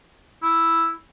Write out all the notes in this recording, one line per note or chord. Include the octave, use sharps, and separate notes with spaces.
E4